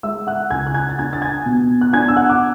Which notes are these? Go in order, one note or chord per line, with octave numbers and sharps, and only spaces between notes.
G#3 E5 E6
F#5 F#6
C#2 G#5 G#6
F#6
G#5 G#6
A6
D4 G#5 G#6
A6
G#5 G#6
B2
F#6
D4 G#5 G#6
E6
F#5 F#6
D6